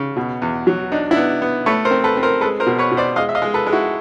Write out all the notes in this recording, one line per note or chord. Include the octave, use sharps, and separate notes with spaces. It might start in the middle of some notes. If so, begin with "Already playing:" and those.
Already playing: C#3
B2
E2
F#3
D4 D#4
D4 E4
B3
B3
A3 B4 C#5
A#4 C5
C4
A4 B4
C4
A#4 C5
G#3 A4 B4
A#4 C5
B2
B4 C#5
B2
C5 D5
G#3 D#5 F5
E5
D#5 F5
G#3
A4 B4
G#3
E4 F#4